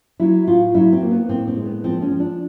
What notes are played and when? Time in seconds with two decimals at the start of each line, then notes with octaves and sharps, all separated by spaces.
0.20 F#3 E4
0.47 A2 F4
0.74 F#3 E4
0.93 C4
1.02 A#3
1.11 B3
1.29 A2 C4
1.47 C4
1.56 G#3
1.66 B3
1.84 F3 C4
2.02 C#4
2.11 F3
2.20 D4